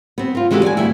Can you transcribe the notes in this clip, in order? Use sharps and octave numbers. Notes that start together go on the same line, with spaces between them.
B3 C4
C4 F4
E3 G#3 F#4 G4 A4
D5 G5 G#5
D2 G2 E4